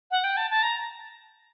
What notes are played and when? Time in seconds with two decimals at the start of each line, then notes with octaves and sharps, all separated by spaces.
0.11 F#5
0.24 G5
0.37 A5
0.50 A5
0.63 A#5